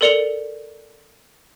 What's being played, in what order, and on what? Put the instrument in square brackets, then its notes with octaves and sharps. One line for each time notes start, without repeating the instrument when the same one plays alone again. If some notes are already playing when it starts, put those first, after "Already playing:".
[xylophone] A4 A#4 D5 C#7 F7 G7